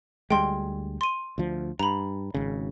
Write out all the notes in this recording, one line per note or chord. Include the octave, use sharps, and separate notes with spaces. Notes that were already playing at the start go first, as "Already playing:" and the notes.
D2 G3 G#3 G5 C6
C6 D#7
D2 F3
G2 A#5 B5
G#1 C#3